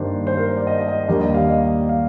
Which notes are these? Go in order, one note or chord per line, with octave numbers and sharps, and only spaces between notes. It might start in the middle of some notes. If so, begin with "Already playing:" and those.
Already playing: G2 D#3 A#3 D4 C5
C5
A#4
C5
D5
D#5
D#5
D#5
D#2 D#3 G3 A#3 D4 D5
D#5
F5
D#5
F5